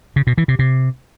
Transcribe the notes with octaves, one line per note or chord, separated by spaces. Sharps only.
C#3
B2
E3
C3
C3